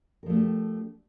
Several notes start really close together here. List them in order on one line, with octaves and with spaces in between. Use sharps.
A#4 F3 A3 D4 G4